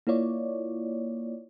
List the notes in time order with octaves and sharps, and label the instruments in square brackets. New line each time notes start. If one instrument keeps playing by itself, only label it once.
[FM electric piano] A#3 E4 F4 C#5 D5